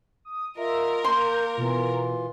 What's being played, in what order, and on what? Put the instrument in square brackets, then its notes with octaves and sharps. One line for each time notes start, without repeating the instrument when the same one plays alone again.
[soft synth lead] D#6
[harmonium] F4 D#5 [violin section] A#4 [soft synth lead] E5
[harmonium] A#3 [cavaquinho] C6 [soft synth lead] G6
[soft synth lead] B2 [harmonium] E3 F4